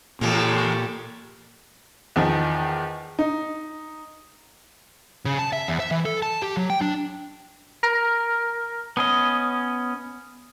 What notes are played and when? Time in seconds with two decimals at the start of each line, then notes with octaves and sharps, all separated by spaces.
0.21 E2 A#2 C#3 G#3 G4 A4
2.16 E2 D#3 F3
3.19 D#4
5.25 C#3
5.39 A5
5.53 E5
5.68 E2
5.80 E5
5.91 E3
6.05 A4
6.23 A5
6.42 G4
6.57 F#3
6.70 G5
6.81 D4
7.83 A#4
8.97 B3 C#4 D#5